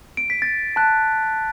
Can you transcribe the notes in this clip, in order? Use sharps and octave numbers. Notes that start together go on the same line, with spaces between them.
D7
B6
A6
A5 F#6